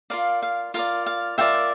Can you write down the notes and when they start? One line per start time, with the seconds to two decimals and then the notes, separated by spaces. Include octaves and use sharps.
0.10 F4 A#4 D5 F5
0.42 F5
0.74 F4 A#4 D5 F5
1.06 F5
1.38 F4 A#4 D5 E5 G5